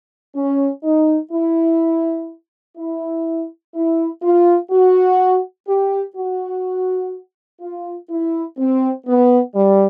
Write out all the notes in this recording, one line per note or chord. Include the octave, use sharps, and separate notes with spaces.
C#4
D#4
E4
E4
E4
F4
F#4
G4
F#4
F4
E4
C4
B3
G3